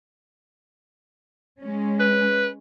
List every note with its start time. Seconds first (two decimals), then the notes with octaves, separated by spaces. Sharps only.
1.61 G#3 C#4
2.00 B4